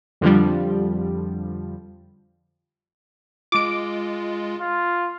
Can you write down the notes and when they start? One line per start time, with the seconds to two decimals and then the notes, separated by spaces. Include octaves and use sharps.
0.21 F2 D3 F3 G3
3.52 G#3 F4 D6 D7
4.61 F4